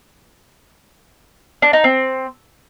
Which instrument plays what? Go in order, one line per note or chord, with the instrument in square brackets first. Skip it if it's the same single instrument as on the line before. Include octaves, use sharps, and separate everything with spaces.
[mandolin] D4
D#4
C4